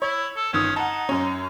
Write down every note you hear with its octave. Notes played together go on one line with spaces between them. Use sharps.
E4 C#5
A4
G1 D#3 C#4 D#6
D#4 F#5 A5
F#2 C#4